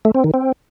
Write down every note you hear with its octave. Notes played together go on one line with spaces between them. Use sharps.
A3
C4
D#3
C4